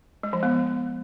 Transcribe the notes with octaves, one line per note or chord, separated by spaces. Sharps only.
G#3
F3
B3